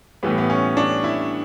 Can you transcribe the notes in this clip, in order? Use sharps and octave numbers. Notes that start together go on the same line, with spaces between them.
A2 E3 G3 B3
B3
C#4
D4
E4